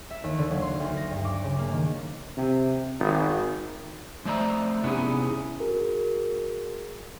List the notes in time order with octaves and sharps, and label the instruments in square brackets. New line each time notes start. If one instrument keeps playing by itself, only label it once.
[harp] E5
D#2
D3
F#3
C6
D2
A#6
G2
D6
C#3
A#3
D#3
[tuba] C3
G#1
[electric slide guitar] F2 A3 C5 D5 E5 A#5
C3 B3 C#4 D#4 E4 G#4
[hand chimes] F#4 G#4 A#4